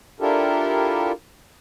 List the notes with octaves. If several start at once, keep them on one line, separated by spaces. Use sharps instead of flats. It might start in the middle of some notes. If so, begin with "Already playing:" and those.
D4 E4 F4 G4 A4 A#4